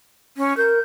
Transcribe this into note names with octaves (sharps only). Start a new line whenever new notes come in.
C#4
A#4 G6